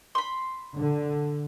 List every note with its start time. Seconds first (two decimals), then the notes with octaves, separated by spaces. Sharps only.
0.15 B5 C6
0.78 D3